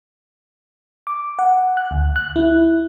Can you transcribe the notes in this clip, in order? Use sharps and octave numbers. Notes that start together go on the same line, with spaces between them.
D6
F#5
F#6
D2
F#6
E4